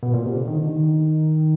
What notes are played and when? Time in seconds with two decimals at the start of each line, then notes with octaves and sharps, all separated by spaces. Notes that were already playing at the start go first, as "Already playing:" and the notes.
0.03 B2
0.14 A#2
0.25 C3
0.36 D3
0.47 D#3
0.58 D3
0.69 D#3